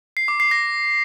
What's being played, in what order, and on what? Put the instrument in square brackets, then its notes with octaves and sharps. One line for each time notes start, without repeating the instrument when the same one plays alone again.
[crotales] C7
D6
C7
A#6